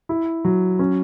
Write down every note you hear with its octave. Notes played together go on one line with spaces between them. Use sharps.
E4
F#3
C#4